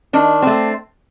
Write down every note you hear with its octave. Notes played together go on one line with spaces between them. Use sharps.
D#3 D4
A3 C4